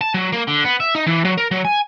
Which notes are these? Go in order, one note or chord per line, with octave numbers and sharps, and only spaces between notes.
A5
F#3
A#3
D3
B3
E5
D#4
E3
F#3
A#4
F#3
G#5